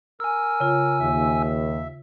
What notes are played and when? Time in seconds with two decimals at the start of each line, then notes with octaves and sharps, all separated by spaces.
0.20 A#4 G#5 E6
0.60 C#3 F4
1.00 D#2 E5